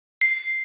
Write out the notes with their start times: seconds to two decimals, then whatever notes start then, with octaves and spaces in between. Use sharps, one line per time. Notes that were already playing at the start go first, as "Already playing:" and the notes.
0.21 C7